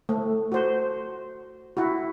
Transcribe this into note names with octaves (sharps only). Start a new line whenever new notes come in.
A3
F#4 C5
E4 F#4